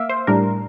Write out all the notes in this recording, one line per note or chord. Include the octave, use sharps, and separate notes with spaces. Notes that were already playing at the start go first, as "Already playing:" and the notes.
Already playing: A#3 E5 F5 D6
C5
A2 G3 D4 A#4